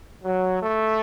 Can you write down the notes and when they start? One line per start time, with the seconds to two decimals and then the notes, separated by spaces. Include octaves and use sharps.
0.24 F#3
0.61 A3